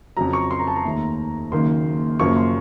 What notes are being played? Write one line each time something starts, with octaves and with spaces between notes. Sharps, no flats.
F2 C#3 F#3 A#5
C#6
C6
A#5
A5
A#5
D#2 D#3 A3
F#1 F#2 D#3 A#3 C6
F#1 F#2 F3 A#3 C#6
C6